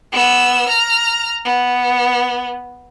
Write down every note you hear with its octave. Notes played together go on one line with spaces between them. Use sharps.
B3 E6
A#5 F6
B3